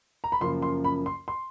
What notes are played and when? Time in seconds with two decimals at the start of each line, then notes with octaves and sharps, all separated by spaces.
0.24 A#5
0.32 B5
0.41 F#2 C#3 F3 A#3 C6
0.62 C6
0.84 B5
1.06 C6
1.28 C6